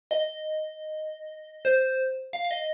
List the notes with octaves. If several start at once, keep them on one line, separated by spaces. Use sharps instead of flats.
D#5
C5
F5
F5
D#5